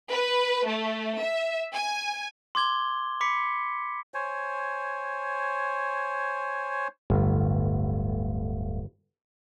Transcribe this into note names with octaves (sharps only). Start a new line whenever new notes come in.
B4
A3
E5
G#5
C6 D6 G#6 G7
B5 D6 B6 C#7
C5 C#5 G#5
D1 G1 A3